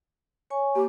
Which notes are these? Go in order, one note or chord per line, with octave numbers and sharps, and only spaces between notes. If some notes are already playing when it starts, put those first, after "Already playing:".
C#5 G#5 C#6
A#3 G4 D6